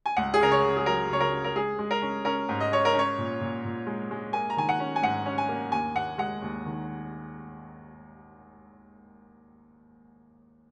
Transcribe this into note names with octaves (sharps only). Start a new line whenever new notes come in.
G#5
C#2 F#5
G#4
C#3 A#4
C#5
C#3
G#4
F#3 A#4
C#3 C#5
A#4
C#4
A#4
G#3 G#4
G#3
A#4
C#4
C#4 A#4
G#2
D#5
C#4 C#5
A#4
C#4 C#5
A#2
A#2
A#2
G#3
G#3
A#3 G#5
A#5
D#3 G#5
F#5
C#4
G#5
G#2 F#5
C#4
G#5
A#3
D#2 G#5
D#2 F#5
G#3 F#5
D#2
D#3